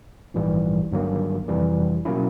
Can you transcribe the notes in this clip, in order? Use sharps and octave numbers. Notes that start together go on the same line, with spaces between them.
A#1 G#2 E3 G3
G1 G2 D#3 F#3 A#3
F2 C3 E3 G3
B2 F#3 A#3 C#4 E4